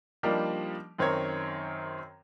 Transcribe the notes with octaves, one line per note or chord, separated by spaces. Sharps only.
F3 G3 A#3 D4 D#4 G4
F#2 D#3 C4 C#5 A#5 G#6